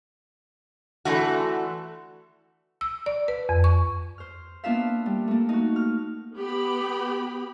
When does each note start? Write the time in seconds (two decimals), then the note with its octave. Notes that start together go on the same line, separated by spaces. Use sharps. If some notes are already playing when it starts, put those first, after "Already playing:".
1.05 D3 E3 A3 F#4 A4
2.81 E6
3.06 D5
3.28 B4
3.49 F2
3.64 C#6
4.18 C5 F6
4.64 A#3 B3 D4 F4 E5 F5
5.06 G3
5.28 A3 A#3
5.49 D#4 F#4
5.76 F6
6.36 B3 G4 B5